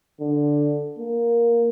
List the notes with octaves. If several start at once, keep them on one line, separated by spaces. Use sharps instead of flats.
D3
A#3